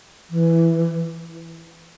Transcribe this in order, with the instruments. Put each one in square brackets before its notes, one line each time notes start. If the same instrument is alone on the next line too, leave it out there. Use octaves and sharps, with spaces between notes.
[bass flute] E3